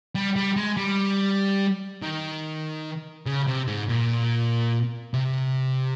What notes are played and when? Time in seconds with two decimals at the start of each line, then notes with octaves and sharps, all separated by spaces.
0.15 G3
0.36 G3
0.56 G#3
0.77 G3
2.02 D#3
3.26 C#3
3.47 C3
3.67 G#2
3.89 A#2
5.13 C3